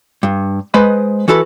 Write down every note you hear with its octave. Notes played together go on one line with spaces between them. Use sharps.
G2
G#3 B4 C5 D#5 B5
E3 F#4 A4 B4 B5